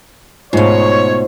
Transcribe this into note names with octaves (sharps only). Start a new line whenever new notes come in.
G#2 B2 A3 D#4 F4 C5 C#5